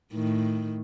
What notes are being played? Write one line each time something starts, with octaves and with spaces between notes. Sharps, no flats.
A2 D#3